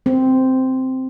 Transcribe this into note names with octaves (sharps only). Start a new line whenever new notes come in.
C4